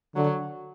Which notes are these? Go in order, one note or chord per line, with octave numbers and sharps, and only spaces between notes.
D3 F#3